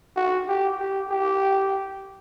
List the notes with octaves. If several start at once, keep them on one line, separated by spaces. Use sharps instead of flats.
F#4
G4
G4
G4